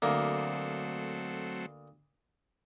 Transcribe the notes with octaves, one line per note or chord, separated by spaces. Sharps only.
D2 F#3 A3 A#3 C4